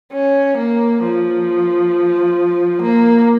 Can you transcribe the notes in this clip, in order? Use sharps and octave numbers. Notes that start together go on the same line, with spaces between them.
C#4
A#3
F3
A#3